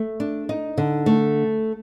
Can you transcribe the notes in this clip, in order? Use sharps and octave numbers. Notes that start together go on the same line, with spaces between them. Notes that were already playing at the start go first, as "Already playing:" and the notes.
Already playing: A3
D4
D#4
D3
A3